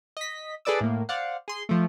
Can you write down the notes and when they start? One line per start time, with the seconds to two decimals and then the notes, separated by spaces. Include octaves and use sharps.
0.17 D#5 B6
0.65 G#4 A4 B4 D5 D6 E6
0.81 A2 A#3
1.09 C5 D5 F5 F#5
1.48 G#4 C6
1.69 F3 A3